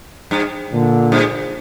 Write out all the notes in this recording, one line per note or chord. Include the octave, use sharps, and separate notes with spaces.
G2
A#2 D3
G2